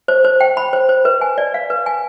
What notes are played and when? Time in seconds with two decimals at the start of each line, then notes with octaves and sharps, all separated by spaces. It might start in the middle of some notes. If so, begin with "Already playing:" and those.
0.08 C5
0.25 C5
0.41 G5
0.57 B5
0.73 C5
0.89 C5
1.05 B4
1.21 G#5
1.38 D5
1.54 F5
1.70 B4
1.86 G#5